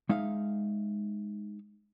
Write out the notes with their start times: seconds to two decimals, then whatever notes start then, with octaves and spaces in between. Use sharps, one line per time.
0.09 G#3 D#4 E5 F5